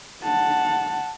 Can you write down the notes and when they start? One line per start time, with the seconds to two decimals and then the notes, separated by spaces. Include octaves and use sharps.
0.23 F#5 A5